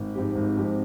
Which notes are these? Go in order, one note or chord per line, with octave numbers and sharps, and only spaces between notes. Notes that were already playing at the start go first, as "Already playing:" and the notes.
Already playing: G#1
G#2 F3 C4 G4
G#1
G#2 F3 C4 G4